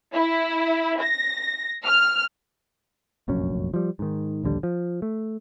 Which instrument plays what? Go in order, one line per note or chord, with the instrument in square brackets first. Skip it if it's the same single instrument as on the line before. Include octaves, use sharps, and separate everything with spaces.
[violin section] E4
A#6
F6
[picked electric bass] F1 A#1 F#2 C#4
F3 G3
G#2 D#3
A#1 D#2 D3 G3
F3
A3